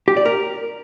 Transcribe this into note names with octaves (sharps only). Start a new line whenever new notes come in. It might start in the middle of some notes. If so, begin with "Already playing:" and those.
G4
D5
A#4